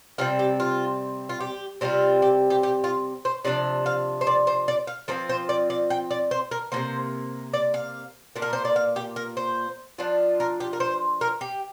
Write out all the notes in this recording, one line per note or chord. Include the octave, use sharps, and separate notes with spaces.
C3 G3 C4 F4
G4
F4
F4
G4
C3 G3 C4 F4
G4
G4
G4
F4
C5
C3 F3 D4 D5
F5
C5
D5
C5
D5
F5
F3 C4 F4 A#4
C5
D5
D5
G5
D5
C5
A#4
C3 F3 A#3 C5
D5
F5
A#2 A#3 D4
A#4
C5
D5
F5
G4
A#4
C5
F3 D4 F4
A#4
G4
A#4
C5
A#4
G4